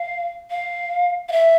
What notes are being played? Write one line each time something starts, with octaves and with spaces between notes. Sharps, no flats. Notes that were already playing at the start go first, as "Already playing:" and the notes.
Already playing: F5
F5
F5
E5